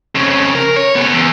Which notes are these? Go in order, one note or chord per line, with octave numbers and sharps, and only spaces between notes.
F2 C#3
A#4
C#5
C#3 B3
E2